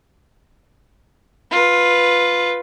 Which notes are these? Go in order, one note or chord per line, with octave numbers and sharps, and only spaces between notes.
F4 B4